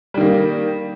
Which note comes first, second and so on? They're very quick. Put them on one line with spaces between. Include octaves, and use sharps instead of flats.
G3 D#3 A#3